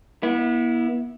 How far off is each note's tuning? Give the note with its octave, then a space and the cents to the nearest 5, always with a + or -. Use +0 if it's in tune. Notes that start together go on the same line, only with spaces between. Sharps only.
B3 -40 E4 -10